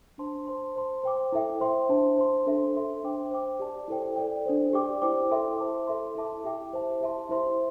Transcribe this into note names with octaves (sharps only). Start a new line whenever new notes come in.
D4 C5 A5 C6
C5 A5 C6
C5 A5 C6
C5 G5 D6
E4 A4 E5 G5
C5 E5 G5 C6
D4 C5 A5
C5 A5 C6
D4 A4 C5 E5
A4 E5 C6
D4 C5 G5 D6
C5 G5 D6
G4 D5 A5
E4 A4 C5 G5
A4 D5 G5
D4 A4 C5
G4 D5 G5 D6
E4 C5 G5 D6
E4 A4 E5 G5 C6
C5 A5 D6
A4 E5 C6
E4 A4 E5 A5 D6
E4 G4 E5 G5 D6
E4 C5 E5 A5
G4 E5 A5 C6
E4 C5 E5 C6